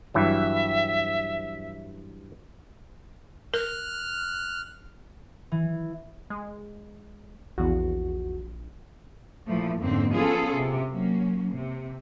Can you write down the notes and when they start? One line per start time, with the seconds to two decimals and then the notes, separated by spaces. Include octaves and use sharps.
0.14 G2 E3 F#3 E5
3.54 A#4 F6 F#6
5.52 E3
6.30 G#3
7.58 A#1 E2 F#4
9.47 A#2 E3 F3 A3
9.80 F2 G#2 D3 A#3 C4 C#4
10.12 F3 B3 C#4 F4 G#4 A4
10.56 C3
10.89 F#3 A#3 C#4
11.51 C3